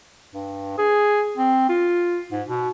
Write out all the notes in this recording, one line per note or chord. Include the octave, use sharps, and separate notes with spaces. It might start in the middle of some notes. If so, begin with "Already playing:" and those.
G2
G#4
C4
F4
G#2
B2